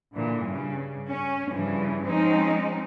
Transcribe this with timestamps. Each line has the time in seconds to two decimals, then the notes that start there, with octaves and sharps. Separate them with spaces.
0.13 A#2 D3 E3
0.44 G2 C#3
1.08 C#4
1.51 G2 C#3 E3 F3
2.05 F3 G#3 C4 C#4 D#4